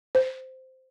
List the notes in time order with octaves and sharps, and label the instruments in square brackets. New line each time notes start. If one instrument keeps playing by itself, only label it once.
[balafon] C5